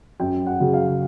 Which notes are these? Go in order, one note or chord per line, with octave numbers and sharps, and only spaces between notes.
F#2 G5
F#5
C#3 F#3
F5